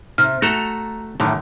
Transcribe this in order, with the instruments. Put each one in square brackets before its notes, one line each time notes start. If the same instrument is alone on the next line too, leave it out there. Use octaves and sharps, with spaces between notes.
[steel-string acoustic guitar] C3 [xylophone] F6
[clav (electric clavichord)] A3 F#4 A4 [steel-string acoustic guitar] A#5
[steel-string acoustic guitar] F#2 [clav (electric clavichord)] A2 D3 D#3